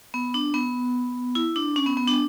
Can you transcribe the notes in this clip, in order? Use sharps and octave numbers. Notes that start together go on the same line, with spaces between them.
B3
D4
B3
E4
D4
C#4
B3
B3
D4